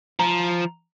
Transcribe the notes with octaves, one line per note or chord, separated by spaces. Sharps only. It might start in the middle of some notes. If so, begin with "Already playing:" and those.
F3 A#5